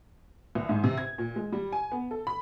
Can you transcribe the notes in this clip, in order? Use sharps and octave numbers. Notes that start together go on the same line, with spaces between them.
C2
G#2
C3
G#6
A#2
G#3
G3
G#5
B3
A4
B5